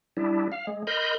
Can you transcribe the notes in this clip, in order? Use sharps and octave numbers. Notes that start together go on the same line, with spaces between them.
G3 D4 E4
F5
G#3
A#4 D#5 B5 C6 G6